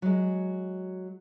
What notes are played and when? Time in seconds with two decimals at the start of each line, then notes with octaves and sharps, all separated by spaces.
0.02 F#3 G#3